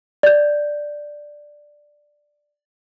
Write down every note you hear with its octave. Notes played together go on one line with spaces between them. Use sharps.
D5 G6